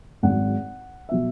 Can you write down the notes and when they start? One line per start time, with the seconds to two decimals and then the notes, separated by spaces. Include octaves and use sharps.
0.23 G#1 G#2 F#3 F#5
1.09 B2 F#3 E5